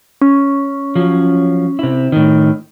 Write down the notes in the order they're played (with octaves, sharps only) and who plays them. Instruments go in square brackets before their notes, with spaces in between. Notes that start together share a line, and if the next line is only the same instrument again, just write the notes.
[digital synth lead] C#4
[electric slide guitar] F3 F#3
C3 E4
A2 D#3